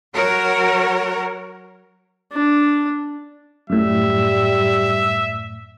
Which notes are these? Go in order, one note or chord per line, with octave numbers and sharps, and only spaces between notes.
F#3 F#4 A#4 C#5
D4
F#2 A2 G3 E5